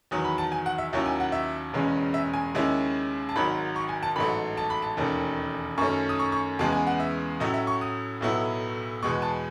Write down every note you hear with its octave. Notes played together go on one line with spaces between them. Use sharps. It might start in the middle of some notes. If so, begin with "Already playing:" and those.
E2 D#3 F#3 D#6
B5
A5
G#5
F#5
E5
D#2 D#3 F#3 C#4 E4 E5
G#5
F#5
E5
E1 E2 C#3 G#3 C#4
E5
G#5
D#2 C#3 G#3 C#4 E4
A5
G#1 G#2 D#3 F#3 B5
C#6
G#5
A5
A1 G#2 F#3 A3 B5
A5
B5
A5
E1 D#2 D#3 A3 C#4
F#2 D#3 A3 C#4 C#6
D#6
C#6
C#6
E2 C#3 E3 G#3 B3 A5
G#5
F#5
E5
A2 F#3 C#4 E4 D#5
E5
C#6
D#6
B1 A2 F#3 B3 E4
E2 B2 G#3 B3 C#6
A5